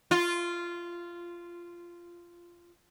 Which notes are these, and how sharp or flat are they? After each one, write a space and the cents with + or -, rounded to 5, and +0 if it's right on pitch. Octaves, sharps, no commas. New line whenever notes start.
F4 -10